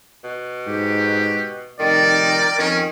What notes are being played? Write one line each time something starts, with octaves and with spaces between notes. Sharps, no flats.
B2
G#2 G4
F1 D#3 A#4 D5 G5
F2 D#3 C#4